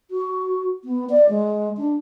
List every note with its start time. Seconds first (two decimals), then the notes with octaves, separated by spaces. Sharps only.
0.11 F#4
0.85 B3
1.10 D5
1.29 G#3
1.77 D4